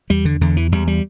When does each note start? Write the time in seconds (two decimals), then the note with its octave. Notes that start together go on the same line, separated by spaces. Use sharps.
0.10 E2 G3
0.25 D3
0.41 E2 D3
0.57 E3
0.72 E2 G3
0.87 G3